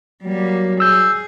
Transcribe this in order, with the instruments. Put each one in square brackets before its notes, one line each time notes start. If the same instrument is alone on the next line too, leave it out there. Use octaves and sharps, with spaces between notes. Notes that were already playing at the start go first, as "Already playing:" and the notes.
[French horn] F#3 [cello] G3 A#3
[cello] G#4 [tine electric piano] E6 G6